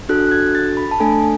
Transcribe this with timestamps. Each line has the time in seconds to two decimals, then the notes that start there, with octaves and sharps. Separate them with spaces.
0.09 D4 F#4 A4 F#6
0.27 F#6
0.31 G#6
0.55 A6
0.77 B5
0.91 A5
1.00 A3 D4 A4 G#5